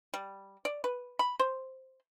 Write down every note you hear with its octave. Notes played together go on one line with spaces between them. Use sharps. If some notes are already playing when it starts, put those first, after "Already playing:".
G3
D5
B4
B5
C5